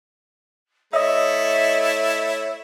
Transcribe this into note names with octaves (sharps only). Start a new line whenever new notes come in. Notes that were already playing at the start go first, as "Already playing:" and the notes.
A3 E4 C#5 D#5 E5